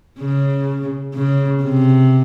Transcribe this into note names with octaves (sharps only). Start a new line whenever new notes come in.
C#3
C#3
C3